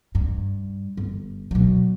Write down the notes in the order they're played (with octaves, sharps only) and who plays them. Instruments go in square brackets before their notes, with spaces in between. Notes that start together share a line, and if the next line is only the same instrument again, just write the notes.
[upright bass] G2
G1
B2 F#3